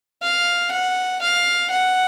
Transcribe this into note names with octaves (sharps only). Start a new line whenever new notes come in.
F5
F#5
F5
F#5